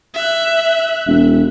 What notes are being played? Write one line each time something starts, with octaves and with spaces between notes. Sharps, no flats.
E5 F#6
E1